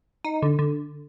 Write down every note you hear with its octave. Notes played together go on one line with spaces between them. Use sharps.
D#4
D3
D3